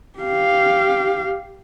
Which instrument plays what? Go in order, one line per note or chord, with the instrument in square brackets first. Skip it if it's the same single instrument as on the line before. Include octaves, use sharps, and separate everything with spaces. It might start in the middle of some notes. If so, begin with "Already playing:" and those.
[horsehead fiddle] G4 F5